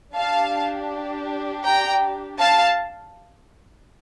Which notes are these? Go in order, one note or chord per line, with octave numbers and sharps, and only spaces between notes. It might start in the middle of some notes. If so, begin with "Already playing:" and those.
D4 G4 F5 A5
G5 A#5
F5 A5